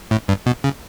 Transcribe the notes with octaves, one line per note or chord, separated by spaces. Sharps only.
A2
G2
B2
C#3